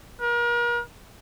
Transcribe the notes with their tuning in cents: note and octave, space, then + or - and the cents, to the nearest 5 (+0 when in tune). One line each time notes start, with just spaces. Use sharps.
A#4 +40